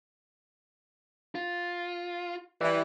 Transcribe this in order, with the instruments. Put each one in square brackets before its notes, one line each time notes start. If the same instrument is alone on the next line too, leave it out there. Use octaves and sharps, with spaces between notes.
[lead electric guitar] F4
[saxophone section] E3 [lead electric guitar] G4 D5